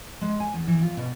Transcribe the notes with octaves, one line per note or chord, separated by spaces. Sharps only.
G#3
G#5
E2
E3
F4
B2